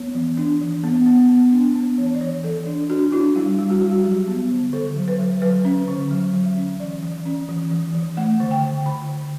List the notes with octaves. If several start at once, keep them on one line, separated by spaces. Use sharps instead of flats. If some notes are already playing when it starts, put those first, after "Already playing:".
Already playing: B3 C#5
E3
D4
E3
B3
B3
B3
D4
B3
E3 C#5
D5
E3 C#5
E3 A4
D4
D4 F#4
D4 E4
G3 E4
G3
F#4
G3
F#3 G4
B3
D3
D3 A4
F#3
B4
F#3
F#3 B4
C#4
D3
F#3
F#3
C#4
E3 D5
E3
C#4
E3
E3
E3
A3 F#5
D3
G5
D3
D3 B5
D3